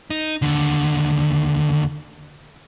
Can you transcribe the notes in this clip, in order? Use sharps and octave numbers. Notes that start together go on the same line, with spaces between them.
D#4
D#2 D3